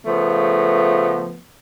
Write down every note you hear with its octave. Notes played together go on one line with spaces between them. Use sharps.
C#3 F3 A3 B3